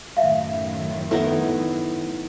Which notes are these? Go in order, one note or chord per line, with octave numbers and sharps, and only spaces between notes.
F#2 A2 D#3 E5 F5
B3 D#4 E4 A4